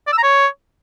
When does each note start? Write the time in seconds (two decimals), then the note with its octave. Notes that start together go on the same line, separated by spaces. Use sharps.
0.07 D5
0.13 E6
0.18 A#5
0.23 C#5